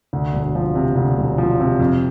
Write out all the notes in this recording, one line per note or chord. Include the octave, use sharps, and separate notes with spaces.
D2
E1
F3
C3
D2
E1
F3
C3
F2